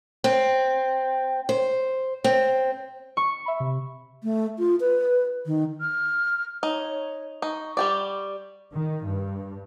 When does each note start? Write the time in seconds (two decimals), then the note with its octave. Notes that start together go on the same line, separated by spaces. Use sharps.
0.24 C4
1.49 C5
2.24 C4
3.17 C#6
3.46 E5 B5
3.60 C3
4.23 A3
4.59 F4
4.80 B4
5.46 D#3
5.80 F6
6.63 D#4 C#5
7.42 D#4 C#6
7.77 G3 G4 D5
8.71 D#3
9.04 G2